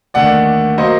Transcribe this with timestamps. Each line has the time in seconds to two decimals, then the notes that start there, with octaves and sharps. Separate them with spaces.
0.14 D#2 D3 A3 D5 F#5
0.78 F#3 A#3 C5 D#5